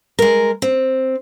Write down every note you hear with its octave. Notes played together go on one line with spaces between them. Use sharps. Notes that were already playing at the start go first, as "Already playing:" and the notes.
G#3 A#4
C4